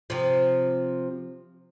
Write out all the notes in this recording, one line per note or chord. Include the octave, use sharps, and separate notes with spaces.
C3 F3